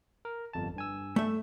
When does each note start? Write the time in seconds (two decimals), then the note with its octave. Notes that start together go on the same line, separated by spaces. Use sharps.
0.25 A#4
0.53 G1 F2 A5
0.76 G2 G#5 E6
1.16 A3 E5